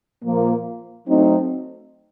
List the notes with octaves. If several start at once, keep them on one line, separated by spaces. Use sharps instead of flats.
A#2 F3 A#3
F#3 A3 C4 D#4